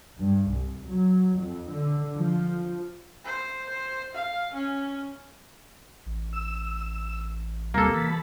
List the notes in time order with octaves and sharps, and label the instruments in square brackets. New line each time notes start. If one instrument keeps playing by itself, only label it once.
[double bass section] G2
C2
F#3
F2
D3
F3
[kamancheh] C5
C5
F5
C#4
[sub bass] A1
[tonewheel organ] E6
[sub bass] D#2 [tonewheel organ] C3 G3 [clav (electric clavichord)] A#3 A4
[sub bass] E3 [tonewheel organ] A5 B5